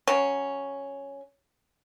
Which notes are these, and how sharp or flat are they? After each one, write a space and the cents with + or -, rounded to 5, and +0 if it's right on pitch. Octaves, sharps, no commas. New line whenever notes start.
F#3 +0 C#4 +0